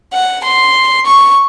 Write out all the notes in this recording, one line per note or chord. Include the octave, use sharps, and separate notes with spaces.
F#5
C6
C#6